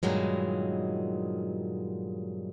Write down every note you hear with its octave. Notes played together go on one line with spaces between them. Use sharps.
G2 A#2 D#3 F#3 G#3